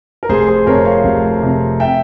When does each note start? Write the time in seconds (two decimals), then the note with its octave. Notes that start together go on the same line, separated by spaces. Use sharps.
0.23 A#4
0.29 F1 G#4 C5
0.48 G#4 C5
0.67 F2 C3 A#4 C#5
0.85 C#5 F5
1.04 F1
1.42 F2 C3
1.80 E5 G5